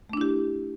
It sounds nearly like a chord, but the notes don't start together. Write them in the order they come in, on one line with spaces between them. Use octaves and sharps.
A3 D4 E4 G4